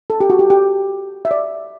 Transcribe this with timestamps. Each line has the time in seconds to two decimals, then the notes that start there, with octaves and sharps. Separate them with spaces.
0.10 A4
0.20 G4
0.30 F#4
0.39 G4
0.50 G4
1.25 E5
1.31 D5